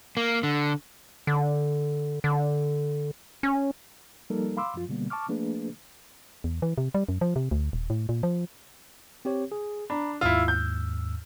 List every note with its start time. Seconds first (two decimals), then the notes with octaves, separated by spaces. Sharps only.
0.17 A#3
0.43 D3
1.27 D3
2.24 D3
3.43 C#4
4.30 F3 G3 A#3 D#4 A4 A#4
4.57 F5 B5 C6 D6 E6
4.74 F#2 F3 F4
4.89 B2 D3 G3 A#3 B3
5.10 A5 C#6 D6 F6
5.28 F3 A3 A#3 D4 G#4 B4
6.44 E2
6.62 E3
6.78 C3
6.95 G3
7.09 F#2
7.21 F3
7.36 C3
7.51 D2
7.73 D#1
7.90 A2
8.09 A#2
8.23 F3
9.25 C4 G4 C#5
9.52 G#4
9.90 D4 A#5 B5
10.21 D#2 G#2 E4 F4 E6
10.48 G6